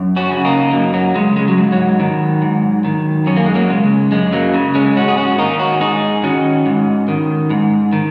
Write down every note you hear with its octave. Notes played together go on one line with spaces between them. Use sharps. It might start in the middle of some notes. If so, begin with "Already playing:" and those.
Already playing: F#2
C#4 F#4
C#3
A#3 D#4
F#2 F#3 A#3
F#3
C#3 G#3
G#3
F#3
G#2
F#3
D#3
G#2
D#3
F#2 C#4
A#3
G#3
F#3 A#3
C#3 G#3
F#2 G#3
F#3 A#3
C#3
G#3 C#4
G#2 C#4 F#4
G#4
C#4 F#4
D#3 A#3 D#4
C#4 F#4
G#2 D#4 G#4
D#3 C#4 F#4
G#2
D#3
G#2
D#3